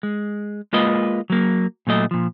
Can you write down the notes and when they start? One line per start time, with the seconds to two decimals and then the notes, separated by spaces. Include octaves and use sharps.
0.03 G#3
0.73 G#3 A#3 F4 B4 D#5
1.30 F#3 A#3
1.87 A#2 F#3 A3 D#5
2.11 A#2 F3